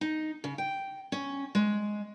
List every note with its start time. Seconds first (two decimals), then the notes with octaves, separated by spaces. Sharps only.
0.01 D#4
0.44 C#3
0.58 G5
1.12 C#4
1.55 G#3